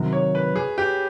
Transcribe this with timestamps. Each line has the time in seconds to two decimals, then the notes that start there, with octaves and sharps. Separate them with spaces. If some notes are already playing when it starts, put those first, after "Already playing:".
Already playing: C3 D#3 F#3
0.13 C#5
0.35 B4
0.56 G#4
0.78 G4